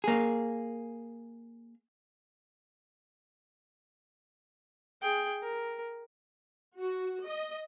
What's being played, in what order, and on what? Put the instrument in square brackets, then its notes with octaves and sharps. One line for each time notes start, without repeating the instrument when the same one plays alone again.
[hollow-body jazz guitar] A#3 G#4
[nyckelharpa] G#4 G5
A#4
[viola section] F#4
D#5